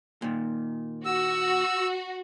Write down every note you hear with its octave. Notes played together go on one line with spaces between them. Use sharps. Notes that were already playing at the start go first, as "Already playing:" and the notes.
A#2 D#3
F#4 E6